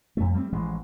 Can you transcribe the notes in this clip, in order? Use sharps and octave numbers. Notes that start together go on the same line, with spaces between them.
F2 A3
G3 A3 A#3 C4
A1 E3 F3 G#3